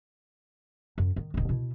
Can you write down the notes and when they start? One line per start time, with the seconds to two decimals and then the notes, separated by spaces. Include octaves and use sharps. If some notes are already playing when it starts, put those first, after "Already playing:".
0.98 F#2
1.16 D#3
1.34 D1 D#3
1.49 B2 E4